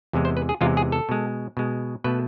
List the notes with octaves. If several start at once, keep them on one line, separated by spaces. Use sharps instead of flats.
E2 C3 E3 G#3
C5
B4
G#4
E2 C3 E3 G#3 F4
G#4
A4
B2 G#3
B2 G#3
B2 A3 B4